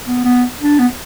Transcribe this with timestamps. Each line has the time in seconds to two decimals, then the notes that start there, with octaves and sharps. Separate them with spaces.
0.07 B3
0.25 B3
0.60 D4
0.79 B3